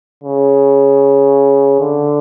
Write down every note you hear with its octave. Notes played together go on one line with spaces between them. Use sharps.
C#3
D3